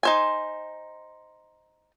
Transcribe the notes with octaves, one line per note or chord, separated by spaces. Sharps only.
D#4 C5 G#5